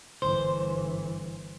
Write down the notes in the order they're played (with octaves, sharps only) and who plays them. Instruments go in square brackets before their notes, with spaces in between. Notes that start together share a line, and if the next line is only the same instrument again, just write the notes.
[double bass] G1 E3 [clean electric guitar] C5